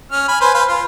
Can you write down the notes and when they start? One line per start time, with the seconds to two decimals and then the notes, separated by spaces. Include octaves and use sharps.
0.11 C#4 F6
0.28 G#5 B5
0.41 B4 C5 G#5
0.54 B4 C5 F5
0.69 F4